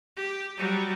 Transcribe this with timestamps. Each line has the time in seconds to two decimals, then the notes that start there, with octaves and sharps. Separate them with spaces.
0.17 G4
0.58 F#3 G3